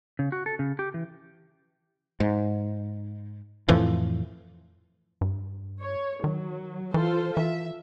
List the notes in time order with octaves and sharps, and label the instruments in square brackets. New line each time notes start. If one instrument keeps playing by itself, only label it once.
[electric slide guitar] C#3
F#4
A4
C#3
G4
E3
[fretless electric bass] G#2
F2 A2 E3 F3
[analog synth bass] G2
[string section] C#5
[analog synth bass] D#3 [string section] F#3
[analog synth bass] E3 [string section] F4 A4 C5
[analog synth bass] E3 [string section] E5